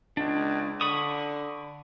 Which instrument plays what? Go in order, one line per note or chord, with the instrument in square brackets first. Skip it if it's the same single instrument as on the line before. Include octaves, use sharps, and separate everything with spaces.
[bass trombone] C#2 [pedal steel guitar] D4
[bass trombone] D3 [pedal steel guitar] B5 C#6 D#6